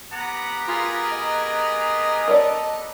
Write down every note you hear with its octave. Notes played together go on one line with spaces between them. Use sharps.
B3 G4 F#5 A#5
F4 G#4 A#4 G#5
D#5
A4 A#4 C#5 D5